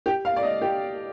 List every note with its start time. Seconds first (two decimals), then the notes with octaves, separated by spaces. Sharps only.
0.06 G4
0.25 F5
0.36 D5
0.43 D#5
0.62 G4